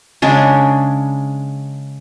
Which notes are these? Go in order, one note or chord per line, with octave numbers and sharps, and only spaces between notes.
C#3 G#3 D4